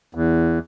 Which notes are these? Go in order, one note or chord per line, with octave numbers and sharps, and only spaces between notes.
E2